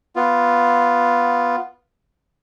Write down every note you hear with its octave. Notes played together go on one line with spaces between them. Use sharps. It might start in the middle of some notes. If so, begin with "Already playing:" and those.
B3 F4